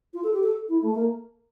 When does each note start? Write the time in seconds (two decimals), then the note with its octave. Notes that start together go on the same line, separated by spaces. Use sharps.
0.14 F4
0.24 A4
0.33 G4
0.43 A4
0.69 E4
0.82 A3
0.95 A#3